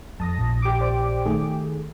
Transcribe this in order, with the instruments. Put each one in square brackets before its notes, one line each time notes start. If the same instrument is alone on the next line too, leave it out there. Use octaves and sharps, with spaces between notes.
[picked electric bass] F2 [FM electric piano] A5 D#6 A#6
[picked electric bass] A#1
[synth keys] G4 D6
[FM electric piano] C5 D5
D#3 A3 G#4